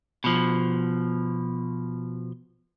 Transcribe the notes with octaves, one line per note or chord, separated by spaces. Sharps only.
B2 F3